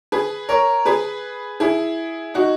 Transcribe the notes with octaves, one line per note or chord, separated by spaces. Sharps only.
G#4 B4
A#4 C#5
G#4 B4
E4 G#4
D#4 F#4